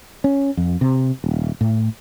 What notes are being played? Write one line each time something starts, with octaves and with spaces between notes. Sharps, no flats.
C#4
F2
C3
D#1
A2